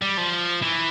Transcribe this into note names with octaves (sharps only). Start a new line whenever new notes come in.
G3
F3
E3